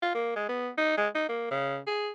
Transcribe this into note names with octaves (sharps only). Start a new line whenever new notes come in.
F4
A#3
G#3
B3
D#4
G#3
D#4
A#3
C#3
G#4